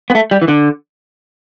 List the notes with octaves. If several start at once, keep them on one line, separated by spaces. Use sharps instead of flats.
B3
A3
G3
E3
D3